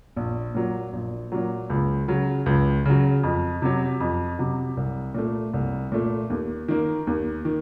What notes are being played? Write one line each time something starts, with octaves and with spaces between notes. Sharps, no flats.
A#1
A#2 F#3
A#1
A#2 F#3
C#2
C#3 F#3
C#2
C#3 F#3
F2
C3 F#3
F2
C3 F#3
C2
A#2 A3
C2
A#2 A3
D#2
D#3 A#3
D#2
D#3